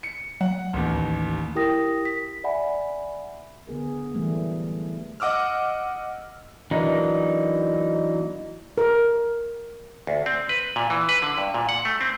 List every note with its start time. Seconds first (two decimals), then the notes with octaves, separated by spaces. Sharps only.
0.03 C#7
0.41 F#3 F#5
0.73 A1 D#2
1.55 E4 G4 A#4 G5 D#6 A#6
2.05 B6
2.44 D5 E5 F#5 G#5 B5
3.67 D3 B3 G#4 A#4
4.14 E3 F#3 G3 A3 A#3 C4
5.20 D#5 F#5 D6 E6 F6
6.71 E3 F#3 A#3 D4 D#4
8.78 A#4
10.07 D2
10.26 C4
10.49 B4
10.76 A#2
10.90 E3
11.09 B4
11.22 D3
11.38 G2
11.54 A#2
11.69 F#5
11.85 A3
12.01 C4